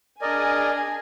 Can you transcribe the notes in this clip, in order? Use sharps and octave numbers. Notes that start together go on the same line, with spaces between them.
D4 G#4 A#4 D5 D#5 G#5